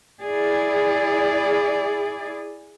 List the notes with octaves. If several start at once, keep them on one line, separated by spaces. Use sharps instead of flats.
E4 G#4 D5